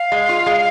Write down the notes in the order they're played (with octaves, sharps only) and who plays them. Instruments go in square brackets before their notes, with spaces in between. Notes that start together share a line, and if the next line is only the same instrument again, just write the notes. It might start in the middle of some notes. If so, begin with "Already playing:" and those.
Already playing: [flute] F5
[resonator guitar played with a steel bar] G#3
F4
G#3